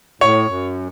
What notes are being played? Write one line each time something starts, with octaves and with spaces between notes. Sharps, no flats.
A2 C#5
F#2